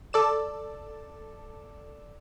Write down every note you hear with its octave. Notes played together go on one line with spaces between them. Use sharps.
A4 D5 E7